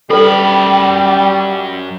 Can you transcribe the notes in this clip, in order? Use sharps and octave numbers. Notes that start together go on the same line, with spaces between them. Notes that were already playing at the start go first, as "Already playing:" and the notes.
F#2 G3 A4 B4 G5 B5